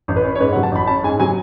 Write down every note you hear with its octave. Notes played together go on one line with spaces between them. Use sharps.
A1
B4
C#4
C#5
G#2 B4
F#5
F#3
A5
A1 B5
C#4 A5
G#2 G#5
F#3 G#5